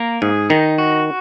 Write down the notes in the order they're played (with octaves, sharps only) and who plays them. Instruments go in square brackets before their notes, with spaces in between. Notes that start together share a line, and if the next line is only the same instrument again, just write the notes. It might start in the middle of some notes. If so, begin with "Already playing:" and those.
Already playing: [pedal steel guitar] A#3 A#4
[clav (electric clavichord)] G#2 [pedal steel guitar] G#4
[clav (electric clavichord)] D#3 [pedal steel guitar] D#4
[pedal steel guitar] F#4